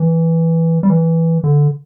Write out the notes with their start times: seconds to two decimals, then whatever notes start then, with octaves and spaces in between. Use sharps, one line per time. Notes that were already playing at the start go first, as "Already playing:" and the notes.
Already playing: E3
0.83 G3
0.90 E3
1.44 D3